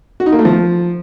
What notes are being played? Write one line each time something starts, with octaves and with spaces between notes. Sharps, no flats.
F#4
D#4
A#3
A3
F3